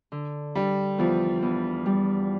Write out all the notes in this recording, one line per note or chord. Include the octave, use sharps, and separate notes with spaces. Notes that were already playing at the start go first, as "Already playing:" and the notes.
D3
G3 D4
E2 F3
E2
G3